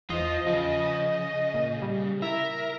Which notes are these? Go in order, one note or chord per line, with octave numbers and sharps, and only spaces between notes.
E2 F4 C5 D#5
C#3 F3
A#2
G3
E4 A#4 E5